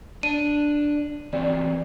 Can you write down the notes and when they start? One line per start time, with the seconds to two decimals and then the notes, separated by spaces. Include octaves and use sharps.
0.23 D4 D#7
1.33 E3 C4 F#4 D5